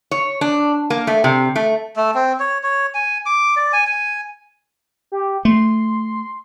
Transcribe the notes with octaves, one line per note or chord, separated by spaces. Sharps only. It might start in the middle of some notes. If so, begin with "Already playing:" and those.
C#5
D4
A#3
A3
C3
A3
A3
C4
C#5
C#5
G#5
D6
D5
G#5
G#5
G4
A3 C6